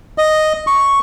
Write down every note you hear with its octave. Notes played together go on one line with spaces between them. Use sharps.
D#5
C#6